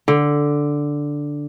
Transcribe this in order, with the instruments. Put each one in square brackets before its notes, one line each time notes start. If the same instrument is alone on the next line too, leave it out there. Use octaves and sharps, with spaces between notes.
[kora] D3